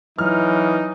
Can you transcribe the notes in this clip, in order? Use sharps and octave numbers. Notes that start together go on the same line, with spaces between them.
E3 F#3 D#4 F6